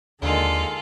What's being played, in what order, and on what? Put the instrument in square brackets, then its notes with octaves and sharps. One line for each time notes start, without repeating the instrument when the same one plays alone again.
[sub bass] D#2 [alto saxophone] D3 [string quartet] D#3 G#3 A#3 [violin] F4 A4